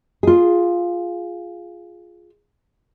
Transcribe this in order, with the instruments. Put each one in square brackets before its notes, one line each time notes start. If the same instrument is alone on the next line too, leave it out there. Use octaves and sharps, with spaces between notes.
[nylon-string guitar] F4 G#4